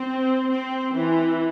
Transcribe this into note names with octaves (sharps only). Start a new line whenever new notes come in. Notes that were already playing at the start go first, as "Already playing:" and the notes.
Already playing: C4
C4
E3